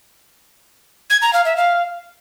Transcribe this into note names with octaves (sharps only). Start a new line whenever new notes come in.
G#6
A#5
F5
E5
F5